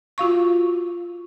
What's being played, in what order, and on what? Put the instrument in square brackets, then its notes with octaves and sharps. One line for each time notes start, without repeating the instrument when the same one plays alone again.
[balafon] F4 F#4 F5 C#6